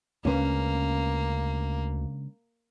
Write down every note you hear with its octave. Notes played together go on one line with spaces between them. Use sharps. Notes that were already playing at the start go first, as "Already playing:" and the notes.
D2 C#3 G#3 A#3 C#4 D4 B4